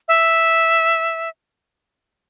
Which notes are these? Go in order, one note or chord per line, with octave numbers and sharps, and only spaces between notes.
E5